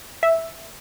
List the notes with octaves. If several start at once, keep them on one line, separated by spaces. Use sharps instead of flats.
E5